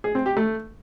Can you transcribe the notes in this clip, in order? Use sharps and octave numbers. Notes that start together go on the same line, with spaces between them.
G#4
C4
G4
A3